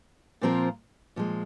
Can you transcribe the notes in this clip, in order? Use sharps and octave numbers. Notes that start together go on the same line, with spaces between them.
A#2 F3 C4 F4 A#4
A#2 F3 G#3